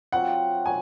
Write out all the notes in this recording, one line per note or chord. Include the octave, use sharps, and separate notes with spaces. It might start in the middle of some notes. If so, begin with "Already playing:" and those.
F#3 C4 F4 F#5
F#3 G#5